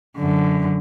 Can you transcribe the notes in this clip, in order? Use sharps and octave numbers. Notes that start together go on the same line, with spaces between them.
F#2 D3